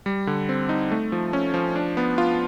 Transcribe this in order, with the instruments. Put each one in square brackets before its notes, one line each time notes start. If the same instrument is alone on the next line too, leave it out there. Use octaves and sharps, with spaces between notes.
[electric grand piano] G3
D3
C4
D#4
A3
F3
C#4
F3
D4
B3
F4